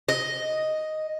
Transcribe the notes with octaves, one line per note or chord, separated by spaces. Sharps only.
D#5